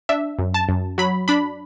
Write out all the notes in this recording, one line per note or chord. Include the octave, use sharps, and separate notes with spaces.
D4 E5
F#2
A5
F#2
F#3 B5
D4 B5